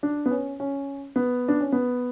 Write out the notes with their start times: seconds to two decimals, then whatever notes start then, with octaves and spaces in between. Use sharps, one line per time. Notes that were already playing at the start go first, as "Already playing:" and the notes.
0.03 D4
0.26 B3
0.31 C#4
0.60 C#4
1.16 B3
1.48 D4
1.61 C#4
1.72 B3